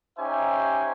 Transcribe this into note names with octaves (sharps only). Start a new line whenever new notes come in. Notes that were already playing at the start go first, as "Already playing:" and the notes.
C#4 D#4 G4 C5 E5 G#5